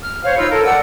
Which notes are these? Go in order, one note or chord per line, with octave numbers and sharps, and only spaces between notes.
F6
C5 C#5 F5
D#4 F4 B5 E6
A4 A#4
D5 F#5 E6